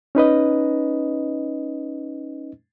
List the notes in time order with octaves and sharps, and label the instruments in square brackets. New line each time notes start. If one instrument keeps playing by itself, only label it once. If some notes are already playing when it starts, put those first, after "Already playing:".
[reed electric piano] C#4 D#4 B4 D#5